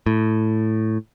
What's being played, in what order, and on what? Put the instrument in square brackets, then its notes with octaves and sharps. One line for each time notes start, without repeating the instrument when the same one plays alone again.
[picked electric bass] A2